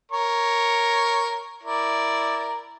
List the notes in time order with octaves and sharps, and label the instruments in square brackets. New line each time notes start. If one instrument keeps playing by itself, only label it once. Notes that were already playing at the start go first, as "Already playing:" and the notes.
[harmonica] A#4 C#5 C#6
E4 A#4 D5